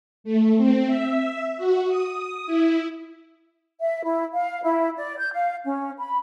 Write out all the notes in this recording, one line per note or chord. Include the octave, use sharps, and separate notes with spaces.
A3
C4
E5
F#4
D#6
E4
E5
E4
F5
E4
D5
G6
F5
C#4
B5